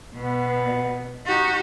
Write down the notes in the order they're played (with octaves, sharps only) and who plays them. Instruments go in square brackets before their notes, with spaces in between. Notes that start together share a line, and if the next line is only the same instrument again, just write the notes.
[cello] B2 [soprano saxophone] B3
[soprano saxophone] D#4 [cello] F#4 G4